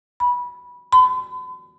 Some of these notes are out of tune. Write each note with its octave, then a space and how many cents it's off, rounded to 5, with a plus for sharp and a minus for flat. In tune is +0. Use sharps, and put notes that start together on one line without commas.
B5 -15
B5 +45